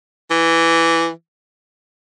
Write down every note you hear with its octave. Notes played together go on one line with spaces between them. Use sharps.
E3